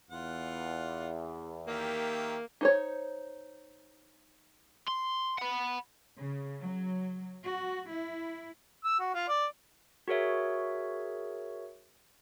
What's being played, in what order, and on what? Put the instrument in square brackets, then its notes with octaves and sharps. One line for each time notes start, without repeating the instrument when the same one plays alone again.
[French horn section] E2 [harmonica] F4 F#5
[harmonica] D#3 G4 E5 [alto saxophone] A#3
[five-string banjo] D#4 C5 C#5
[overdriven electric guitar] C6
F#5 B5
[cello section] C#3
F#3
F#4
E4
[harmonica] E6
F#4
F4
D5
[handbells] F#4 G#4 A#4 C#5 E5